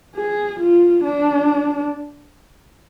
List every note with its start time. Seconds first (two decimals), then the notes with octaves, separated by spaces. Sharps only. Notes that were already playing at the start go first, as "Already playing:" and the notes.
0.16 G#4
0.60 F4
1.03 D4